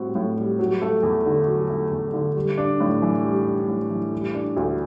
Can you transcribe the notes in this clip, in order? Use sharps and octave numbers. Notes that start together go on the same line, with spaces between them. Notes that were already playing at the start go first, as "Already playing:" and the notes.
Already playing: A2 G3 C4 F#4
A2
G3
F#3
A3
E2
D3
F#3
A3
E2
D3
G3
D4
A2
E3
G3
D4
A2
E3
G3
D4
D2